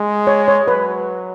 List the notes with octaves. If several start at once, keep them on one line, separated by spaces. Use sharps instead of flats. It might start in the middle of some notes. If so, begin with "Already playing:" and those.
Already playing: G#3
C#5
C#5
F#3 B4